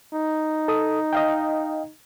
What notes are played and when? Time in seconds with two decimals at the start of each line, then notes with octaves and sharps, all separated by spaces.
0.14 D#4
0.68 A4 D#6
1.13 D#5 F5 G5